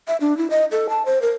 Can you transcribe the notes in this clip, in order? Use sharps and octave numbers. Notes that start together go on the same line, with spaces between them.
E5
D4
E4
D#5
A4
A5
C5
A#4